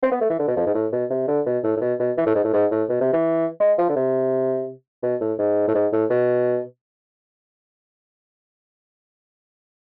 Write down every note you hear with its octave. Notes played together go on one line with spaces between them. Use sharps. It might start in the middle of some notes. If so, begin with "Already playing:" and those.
C4
B3
A3
E3
D3
B2
F2
G#2
A2
B2
C3
D3
B2
A2
A2
B2
B2
E3
A2
G#2
A2
G#2
A2
B2
C3
E3
G#3
F3
D3
C3
B2
A2
G#2
A2
G#2
A2
B2